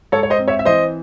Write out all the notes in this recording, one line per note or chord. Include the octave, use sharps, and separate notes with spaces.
G#2 A4 C#5
C#5
C5 D#5
C4
C#5 E5
E5
E3 C5 D#5